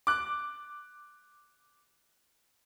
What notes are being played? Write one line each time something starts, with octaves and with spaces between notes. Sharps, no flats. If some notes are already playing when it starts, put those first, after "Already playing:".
D6 F#6